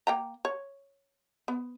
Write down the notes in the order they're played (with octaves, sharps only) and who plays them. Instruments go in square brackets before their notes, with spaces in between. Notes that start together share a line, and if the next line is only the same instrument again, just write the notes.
[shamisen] A#3 G5 A#5
C#5
B3